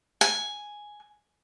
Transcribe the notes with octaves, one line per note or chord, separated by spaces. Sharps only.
G#5